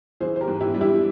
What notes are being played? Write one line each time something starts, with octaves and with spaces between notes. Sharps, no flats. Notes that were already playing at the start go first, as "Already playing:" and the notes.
E3 G#4 C5
C5
G4 A#4
G#2
E4 G4
G3
E4 G4